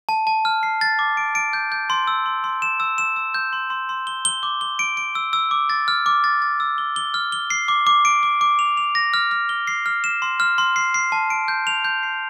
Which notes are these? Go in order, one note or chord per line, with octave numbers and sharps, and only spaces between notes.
A5
A5
F6
C7
A6
D6
D7
D7
G6
G6
C6
E6
C6
C6
E7
E6
E7
E6
G6
C6
C6
C6
G7
G7
D6
G7
D7
D7
E6
E6
D6
A6
F6
D6
A6
A6
E6
G7
G7
F6
G7
C7
D6
D6
D7
D6
D6
F7
F7
A#6
F6
F6
G7
C7
F6
E7
C6
F6
C6
C7
C7
A5
D7
G6
F7
G6
C7